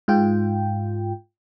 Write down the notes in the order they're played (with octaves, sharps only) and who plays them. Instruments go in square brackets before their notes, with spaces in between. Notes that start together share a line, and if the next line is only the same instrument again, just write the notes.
[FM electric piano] G#2 F4 G5